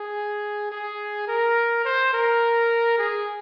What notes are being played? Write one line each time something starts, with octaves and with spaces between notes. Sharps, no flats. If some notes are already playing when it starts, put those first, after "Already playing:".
Already playing: G#4
G#4
A#4
C5
A#4
G#4